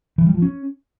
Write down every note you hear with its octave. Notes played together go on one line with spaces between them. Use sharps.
E3
G3
F3
C#4